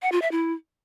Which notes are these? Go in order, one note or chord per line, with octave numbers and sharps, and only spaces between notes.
F#5
F4
E5
E4